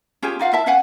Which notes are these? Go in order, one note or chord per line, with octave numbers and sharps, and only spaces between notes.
C#4 F4 G4 G#4
D#4 F4 F5 F#5
E4 E5 A5
C#4 F5 F#5 G#5